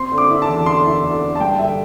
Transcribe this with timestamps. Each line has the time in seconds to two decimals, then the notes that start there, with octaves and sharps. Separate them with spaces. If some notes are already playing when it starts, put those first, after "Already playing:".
Already playing: C4 C6
0.12 D3
0.18 D6
0.30 E4
0.42 A5
0.49 E2
0.66 D3 C6
0.85 E4
1.03 D3
1.22 D3
1.35 A5
1.40 G2 G5
1.58 D3 E5